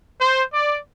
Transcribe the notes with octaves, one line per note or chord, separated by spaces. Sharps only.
C5
D5